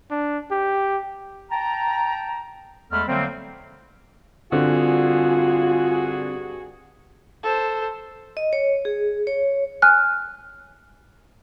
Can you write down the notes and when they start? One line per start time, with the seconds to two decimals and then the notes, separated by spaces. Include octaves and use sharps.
0.11 D4
0.51 G4
1.50 G5 A5 A#5
2.91 E2 G#3 A3 A4 B5 F6
3.08 D3 F#3 G3 A3 A#3 C4
4.52 G2 D3 C4 F4 F#4 G#4
7.43 A4 C5
8.37 D#5
8.53 C#5
8.85 G#4
9.27 C#5
9.82 G#5 F6 F#6